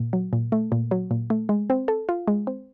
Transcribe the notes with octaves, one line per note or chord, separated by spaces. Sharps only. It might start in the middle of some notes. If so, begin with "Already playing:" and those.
Already playing: A#2
F#3
A#2
A3
A#2
F#3
A#2
A3
G#3
C4
A4
F4
G#3
C4